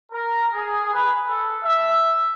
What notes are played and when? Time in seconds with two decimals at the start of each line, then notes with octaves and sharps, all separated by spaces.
0.11 A#4
0.52 G#4
0.92 B4
1.28 A4
1.64 E5